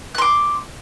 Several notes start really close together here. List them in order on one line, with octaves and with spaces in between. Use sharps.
F#6 C6 D6